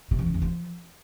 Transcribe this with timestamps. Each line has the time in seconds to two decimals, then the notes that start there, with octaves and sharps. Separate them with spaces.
0.11 C3
0.19 E2
0.26 C#3
0.34 E2
0.42 F3